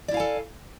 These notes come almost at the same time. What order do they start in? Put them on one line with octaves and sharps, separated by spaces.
D5 E4 F5 G#5 A4